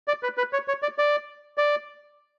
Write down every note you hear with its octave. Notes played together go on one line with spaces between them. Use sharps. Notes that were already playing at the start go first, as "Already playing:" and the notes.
D5
B4
B4
C#5
C#5
D5
D5
D5